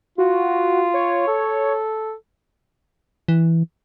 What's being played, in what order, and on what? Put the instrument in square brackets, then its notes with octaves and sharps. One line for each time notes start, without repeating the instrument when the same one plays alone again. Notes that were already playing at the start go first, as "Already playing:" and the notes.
[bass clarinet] F4 [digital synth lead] F#4
[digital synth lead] C#5
[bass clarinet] A4
[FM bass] E3